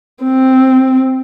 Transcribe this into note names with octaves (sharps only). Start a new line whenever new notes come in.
C4